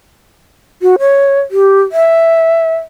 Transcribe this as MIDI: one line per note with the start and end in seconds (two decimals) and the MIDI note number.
0.82 0.96 66
0.99 1.39 73
1.51 1.81 67
1.92 2.76 76